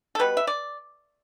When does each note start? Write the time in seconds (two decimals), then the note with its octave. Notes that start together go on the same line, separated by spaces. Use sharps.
0.15 A4
0.19 B2 G3 B3 B4
0.37 E5
0.47 D5